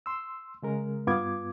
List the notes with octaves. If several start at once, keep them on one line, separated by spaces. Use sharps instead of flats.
C6 E6
C#3 G#3 A#4
G2 B3 F4 D6 G#6